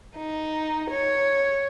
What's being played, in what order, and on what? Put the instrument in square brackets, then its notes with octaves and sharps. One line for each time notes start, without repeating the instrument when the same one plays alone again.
[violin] D#4
C#5